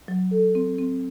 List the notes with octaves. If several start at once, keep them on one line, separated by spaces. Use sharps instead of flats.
F#3
A4
C4
C4